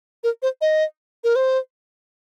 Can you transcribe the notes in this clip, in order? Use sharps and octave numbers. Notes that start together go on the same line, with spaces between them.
A#4
C5
D#5
A#4
C5